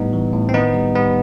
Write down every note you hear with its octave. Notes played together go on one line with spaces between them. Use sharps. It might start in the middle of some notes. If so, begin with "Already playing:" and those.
Already playing: A2 G3 B3 D#4
E3
A2
C4
D#3 B3 D#4
G3
G3 B3